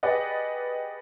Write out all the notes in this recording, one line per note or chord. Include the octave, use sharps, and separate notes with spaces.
G4 G#4 B4 D5 D#5 F#5